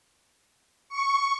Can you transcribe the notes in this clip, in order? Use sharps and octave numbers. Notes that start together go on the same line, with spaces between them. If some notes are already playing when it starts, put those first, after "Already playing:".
C#6